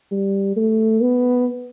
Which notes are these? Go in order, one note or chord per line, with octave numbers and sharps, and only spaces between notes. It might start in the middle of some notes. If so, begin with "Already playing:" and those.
G3
A3
B3